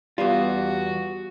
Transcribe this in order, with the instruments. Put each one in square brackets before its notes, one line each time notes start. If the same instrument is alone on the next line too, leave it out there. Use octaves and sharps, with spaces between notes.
[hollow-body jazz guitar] E2 F4 [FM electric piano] G3 B3 [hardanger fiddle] F#4